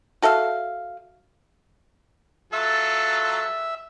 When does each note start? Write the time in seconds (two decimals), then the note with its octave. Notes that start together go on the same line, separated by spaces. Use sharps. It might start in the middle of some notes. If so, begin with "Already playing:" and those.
0.22 F#4 A4 E5 F5
2.53 F#3 F4 A4 E5